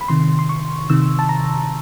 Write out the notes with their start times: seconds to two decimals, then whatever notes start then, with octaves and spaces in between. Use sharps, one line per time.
0.01 B5
0.08 C3 D#3 C6
0.39 C6
0.49 C#6
0.90 C3 D#3 E6
1.19 A5
1.29 A#5